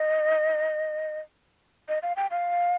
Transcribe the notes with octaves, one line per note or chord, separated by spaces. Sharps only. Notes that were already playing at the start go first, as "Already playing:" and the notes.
Already playing: D#5
D#5
F5
G5
F5